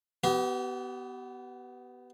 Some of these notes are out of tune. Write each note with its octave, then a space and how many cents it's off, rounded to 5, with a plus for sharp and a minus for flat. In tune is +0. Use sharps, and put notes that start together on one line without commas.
B3 +5 G4 -35